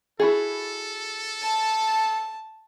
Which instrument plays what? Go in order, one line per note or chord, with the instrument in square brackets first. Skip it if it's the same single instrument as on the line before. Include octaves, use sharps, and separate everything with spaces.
[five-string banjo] E4 F#4 G#4 [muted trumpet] A4
[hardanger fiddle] A5